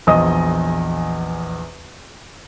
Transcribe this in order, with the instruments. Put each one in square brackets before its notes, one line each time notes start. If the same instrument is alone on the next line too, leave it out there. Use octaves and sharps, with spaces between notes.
[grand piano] A#1 E2 D#5 D#6